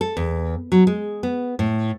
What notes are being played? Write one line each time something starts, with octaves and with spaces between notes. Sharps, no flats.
A4
E2
F#3
G#3
B3
A2